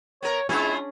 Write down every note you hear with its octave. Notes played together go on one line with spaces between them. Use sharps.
B3 A#4 C#5
G#3 B3 C#4 D4 E4 F4 G#4